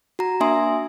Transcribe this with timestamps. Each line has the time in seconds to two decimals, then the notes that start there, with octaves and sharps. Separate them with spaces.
0.19 F#4 A#5
0.40 A#3 D4 E5 G#5 C6 D#6